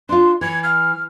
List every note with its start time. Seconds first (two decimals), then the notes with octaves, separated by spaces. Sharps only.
0.09 D4 F4 C6
0.41 E3 G#6
0.63 F6